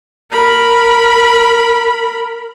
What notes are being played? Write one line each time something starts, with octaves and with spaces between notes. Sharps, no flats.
A#4 B5